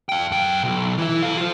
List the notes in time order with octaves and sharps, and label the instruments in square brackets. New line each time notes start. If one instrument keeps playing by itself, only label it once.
[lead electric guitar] F5 G5
F#2 G5
B1
E3 E4
A4 F5
F4 C5